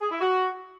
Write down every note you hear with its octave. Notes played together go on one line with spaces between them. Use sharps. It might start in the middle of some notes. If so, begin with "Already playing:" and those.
G#4
E4
F#4